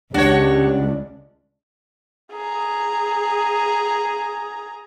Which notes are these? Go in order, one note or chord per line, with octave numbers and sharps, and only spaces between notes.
C#2 D4 F#4 G4 C#5
G#4 A#5